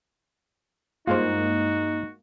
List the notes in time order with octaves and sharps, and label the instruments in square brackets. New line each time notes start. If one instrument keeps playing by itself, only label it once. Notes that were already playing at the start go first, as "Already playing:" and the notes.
[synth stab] G2 G#3 A#3 [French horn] D#4 [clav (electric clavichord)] F4 C5 [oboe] F#4